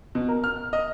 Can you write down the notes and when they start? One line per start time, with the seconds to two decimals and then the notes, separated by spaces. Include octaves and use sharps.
0.15 B2
0.29 A#4
0.44 F6
0.73 D#5